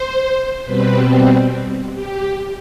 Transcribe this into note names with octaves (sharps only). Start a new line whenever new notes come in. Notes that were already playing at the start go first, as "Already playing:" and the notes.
Already playing: C5
B2 G3 C4 B4
G4